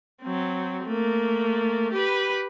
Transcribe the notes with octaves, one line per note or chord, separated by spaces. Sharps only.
F#3 C4
A3 A#3
G4 B4